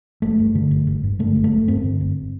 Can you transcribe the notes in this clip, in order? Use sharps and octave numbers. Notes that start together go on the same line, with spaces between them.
G1 A3
G2
D3
G1
G1
G2
D3 A3
G1
A3
G1
G2 C4
D3
G1